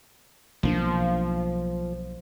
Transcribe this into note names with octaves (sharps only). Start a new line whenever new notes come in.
B1 F3 A#3 D4